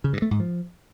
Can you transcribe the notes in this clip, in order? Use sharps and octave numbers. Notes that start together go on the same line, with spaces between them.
C#3
G2
A3
G#2
F3